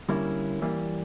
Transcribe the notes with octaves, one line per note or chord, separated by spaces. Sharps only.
D3 G3 A#3 C#4 E4
E3 G3 A#3